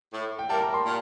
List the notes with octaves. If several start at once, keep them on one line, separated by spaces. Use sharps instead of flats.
A2
G5
G3 A#3 E4 A#4 A5
A#5
C6
A#2